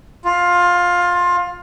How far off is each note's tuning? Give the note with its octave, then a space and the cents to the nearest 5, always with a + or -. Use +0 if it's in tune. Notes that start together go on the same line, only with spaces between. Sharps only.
F4 +15